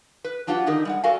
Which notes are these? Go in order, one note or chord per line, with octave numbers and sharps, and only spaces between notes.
B4
F#3 D4 F4 G4 F#5
D3 D#3 D#4 E4 G4 A#4
G3 G#3 F#5
F#4 A4 A#4 D5 F5 G#5